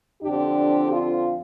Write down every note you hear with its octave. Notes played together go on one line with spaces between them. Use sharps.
F2 D3 F3 C4 D4 G4
F4